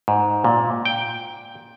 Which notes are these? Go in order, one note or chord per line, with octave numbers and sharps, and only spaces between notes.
G#2
A#2
G5